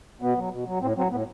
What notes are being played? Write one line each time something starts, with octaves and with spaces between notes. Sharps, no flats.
B2 B3
F#3
B2
F#3
A2 C4
F#3 C4
A2 B3